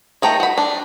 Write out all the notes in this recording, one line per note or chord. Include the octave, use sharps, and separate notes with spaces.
D#3 A3 G5 A#5
F#4 B5
D4